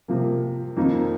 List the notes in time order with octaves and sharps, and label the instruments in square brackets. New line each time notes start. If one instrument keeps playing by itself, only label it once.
[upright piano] C3 F3 A#3
F2 D#3 A#3 D#4